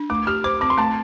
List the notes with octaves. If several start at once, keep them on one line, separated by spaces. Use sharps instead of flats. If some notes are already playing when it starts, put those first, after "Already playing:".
Already playing: D4
A3 D6
G4 F6
C5 D6
C4 D6
C6
A3 A5